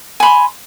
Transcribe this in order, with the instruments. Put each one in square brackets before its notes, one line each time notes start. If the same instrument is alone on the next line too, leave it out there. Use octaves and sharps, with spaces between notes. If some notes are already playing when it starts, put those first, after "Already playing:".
[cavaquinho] G#5
B5
C6